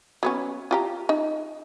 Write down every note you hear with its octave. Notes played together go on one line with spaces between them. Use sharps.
F#3 B3 C#4
F4 G4 A#5
D#4